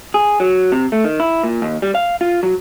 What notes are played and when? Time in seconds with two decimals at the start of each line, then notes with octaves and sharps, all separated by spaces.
0.14 G#4
0.40 F#3
0.72 C3
0.92 A3
1.04 D#3
1.20 E4
1.44 A#2
1.62 D#2
1.82 G3
1.95 F5
2.21 F4
2.43 F#3